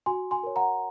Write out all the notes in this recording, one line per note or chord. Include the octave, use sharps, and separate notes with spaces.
F#4 G#5 C6
G#5 C6
A#4 C#5
F#5 A#5